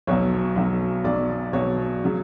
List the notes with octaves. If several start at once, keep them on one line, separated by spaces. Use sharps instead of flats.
B1 B2 F#3 C#5
B1 B2 F#3
B1 B2 F#3 D5
B1 B2 F#3 C#5
C#3 F#3